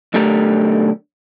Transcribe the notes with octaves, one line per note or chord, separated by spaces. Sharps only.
B1 D3 A3 G4 A#4